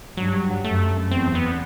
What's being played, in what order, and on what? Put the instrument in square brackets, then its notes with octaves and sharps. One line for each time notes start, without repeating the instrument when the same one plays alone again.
[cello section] G2 [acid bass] F#3
[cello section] F#2 [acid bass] A3
[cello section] E2 [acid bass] C4
[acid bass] B3